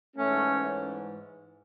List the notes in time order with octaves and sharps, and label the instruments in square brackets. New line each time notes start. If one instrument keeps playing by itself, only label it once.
[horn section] G#2 E3 A3 C#4